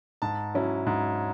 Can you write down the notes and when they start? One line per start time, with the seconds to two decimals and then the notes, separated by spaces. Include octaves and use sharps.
0.22 G#2 A5
0.55 F#3 C#4 E4
0.87 G#2